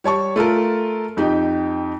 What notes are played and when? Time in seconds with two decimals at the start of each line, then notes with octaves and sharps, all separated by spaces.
0.04 G3 C#5 A5 C#6
0.36 A3 F4 A4 A#4
1.17 F2 D#4 G4